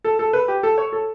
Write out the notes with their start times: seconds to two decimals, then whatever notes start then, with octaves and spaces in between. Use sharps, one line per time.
0.04 A4
0.19 A4
0.33 B4
0.48 G4
0.63 A4
0.78 C#5
0.92 A4